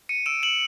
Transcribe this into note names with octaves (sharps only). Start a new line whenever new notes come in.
C#7 D#7
E6 D7 E7
E7 F#7